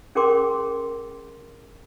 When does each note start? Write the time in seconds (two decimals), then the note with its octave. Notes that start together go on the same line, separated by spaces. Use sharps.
0.15 C#4 G#4 A#4 G5 C6 D6